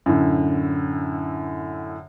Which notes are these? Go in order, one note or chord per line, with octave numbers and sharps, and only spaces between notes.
F#2 A2 D3